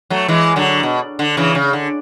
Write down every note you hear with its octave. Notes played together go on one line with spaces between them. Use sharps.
F#3 A3
E3 G#3
D3 F#3
B2
D3
C#3 E3
C#3
D3